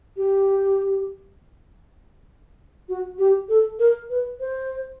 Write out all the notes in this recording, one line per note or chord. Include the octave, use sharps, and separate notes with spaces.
G4
F#4
G4
A4
A#4
B4
C5